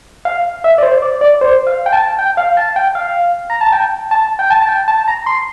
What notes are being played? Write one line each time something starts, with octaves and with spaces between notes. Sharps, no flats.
F5
E5
D5
C5
D5
D5
C5
F5
G5
A5
G5
F5
A5
G5
F5
A#5
A5
G5
A5
G5
A5
A5
G5
A5
A#5
C6